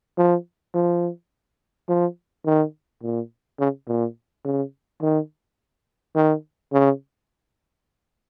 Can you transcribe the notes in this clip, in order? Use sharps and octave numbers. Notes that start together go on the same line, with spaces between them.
F3
F3
F3
D#3
A#2
C#3
A#2
C#3
D#3
D#3
C#3